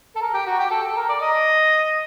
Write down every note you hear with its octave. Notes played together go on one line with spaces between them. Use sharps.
A4
A#4
G4
F#4
G4
A4
A4
A#4
D5
D#5